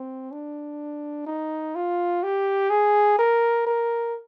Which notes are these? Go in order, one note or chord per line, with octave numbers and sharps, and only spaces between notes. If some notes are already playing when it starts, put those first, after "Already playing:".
Already playing: C4
D4
D#4
F4
G4
G#4
A#4
A#4